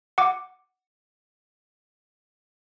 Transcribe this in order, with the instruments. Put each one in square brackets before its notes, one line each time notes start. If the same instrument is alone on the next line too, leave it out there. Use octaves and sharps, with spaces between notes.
[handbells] F#5 D6